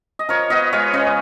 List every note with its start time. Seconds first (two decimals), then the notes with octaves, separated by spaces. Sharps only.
0.19 D#5
0.29 F3 A#4 C#5
0.50 B3 B4 D#5
0.73 G#3 C#5 F5
0.93 C#3 B4 D#5